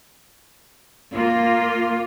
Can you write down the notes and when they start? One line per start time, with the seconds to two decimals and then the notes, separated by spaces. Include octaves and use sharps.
1.12 A#3 F4